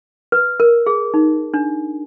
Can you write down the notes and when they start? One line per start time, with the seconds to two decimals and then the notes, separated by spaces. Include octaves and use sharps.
0.32 B4
0.60 A#4
0.86 G#4
1.14 D#4
1.54 D4